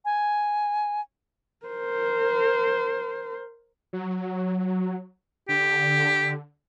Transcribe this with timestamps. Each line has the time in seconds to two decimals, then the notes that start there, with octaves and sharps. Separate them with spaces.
0.05 G#5
1.66 A#4 C5
3.93 F#3
5.49 D3 G4